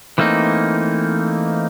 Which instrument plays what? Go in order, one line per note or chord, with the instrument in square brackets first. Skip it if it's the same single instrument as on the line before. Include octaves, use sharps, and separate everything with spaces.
[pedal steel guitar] E3 A3 A#3 C4 D#4